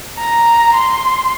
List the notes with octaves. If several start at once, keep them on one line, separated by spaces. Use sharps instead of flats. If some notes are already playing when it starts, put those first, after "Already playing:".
A#5
C6